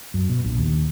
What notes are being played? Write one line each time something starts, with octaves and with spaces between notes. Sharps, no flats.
F#2
B2
A#1
D#2